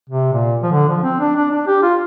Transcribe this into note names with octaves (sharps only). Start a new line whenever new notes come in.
C3
A#2
F3
D3
F3
C4
D4
D4
D4
G4
F4